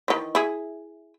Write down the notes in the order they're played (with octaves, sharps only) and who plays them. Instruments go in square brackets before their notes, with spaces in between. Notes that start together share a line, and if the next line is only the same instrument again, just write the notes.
[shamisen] D#3 E3
E4 G#4